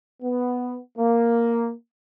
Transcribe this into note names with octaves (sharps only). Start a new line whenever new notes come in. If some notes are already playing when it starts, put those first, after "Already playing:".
B3
A#3